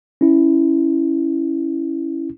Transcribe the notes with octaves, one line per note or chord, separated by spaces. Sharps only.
C#4 E4